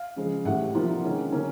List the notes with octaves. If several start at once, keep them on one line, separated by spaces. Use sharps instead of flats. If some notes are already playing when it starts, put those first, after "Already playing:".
Already playing: F5
C#3 F3 G#3
A2 E3 G3 F#5
C3 F3 A#3 D4 F4
D#3 G#3 C#4
D3 F#3 A#3 C#4